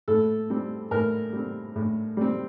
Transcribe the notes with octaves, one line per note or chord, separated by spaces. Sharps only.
A2 A4
G3 C4
A2 A#4
G3 C4
A2
G3 C4